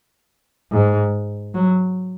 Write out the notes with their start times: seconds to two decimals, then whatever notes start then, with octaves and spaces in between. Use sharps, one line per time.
0.72 G#2
1.54 F#3